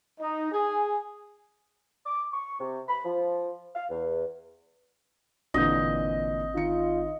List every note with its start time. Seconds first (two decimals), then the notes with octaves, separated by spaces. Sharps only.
0.19 D#4
0.52 G#4
2.06 D6
2.32 C#6
2.59 C3
2.87 B5
3.04 F3
3.75 F5
3.90 E2
5.54 G#1 A#2 D3 E3 C4 D#5 G6
6.55 D#3 F4 C#7